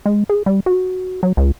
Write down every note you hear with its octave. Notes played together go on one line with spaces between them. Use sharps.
G#3
G#4
G3
F#4
F#3
C#2